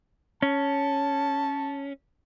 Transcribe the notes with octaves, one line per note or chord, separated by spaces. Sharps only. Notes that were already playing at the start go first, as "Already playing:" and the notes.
C#4 A5